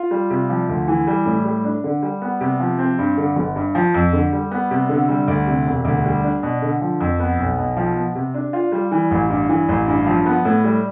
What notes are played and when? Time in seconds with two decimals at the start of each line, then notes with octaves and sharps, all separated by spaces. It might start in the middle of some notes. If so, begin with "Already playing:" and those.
Already playing: F4
0.11 G3
0.30 C3
0.50 F3
0.69 D2
0.88 E3
1.07 G3
1.25 A2
1.45 G3
1.64 D4
1.84 D3
2.03 G3
2.22 B3
2.41 C3
2.60 F3
2.79 C4
2.98 G2
3.17 D3
3.36 G1
3.56 G2
3.75 F3
3.94 F2
4.13 D3
4.33 G3
4.51 B3
4.71 C3
4.89 D3
5.08 G3
5.28 D2
5.47 C3
5.66 E1
5.85 D2
6.05 G3
6.24 D4
6.43 B2
6.62 D3
6.81 F3
7.00 F2
7.20 B3
7.38 B1
7.58 B2
7.77 F3
7.96 B3
8.15 C3
8.34 D4
8.53 F4
8.72 G3
8.91 E3
9.11 A1
9.29 G2
9.49 E3
9.69 A1
9.87 G2
10.06 F3
10.26 B3
10.45 A2
10.64 G3